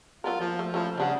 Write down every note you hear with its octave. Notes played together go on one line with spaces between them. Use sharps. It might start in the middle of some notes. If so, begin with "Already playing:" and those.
F#3 B3 F4 A#4
F3 A#3
A3
F3 A3 C#4 E4
C#3 G3 D4 F#5